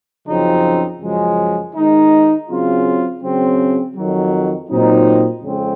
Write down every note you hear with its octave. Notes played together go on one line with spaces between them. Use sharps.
F#2 C#3 F3 C4 D#4
F#2 C#3 F3 G#3
D#3 G#3 D#4
C#3 F#3 C4 F4
C#3 F#3 C4
F2 D#3 F#3
A#2 F#3 C4 D#4
F2 C#3 G#3 C4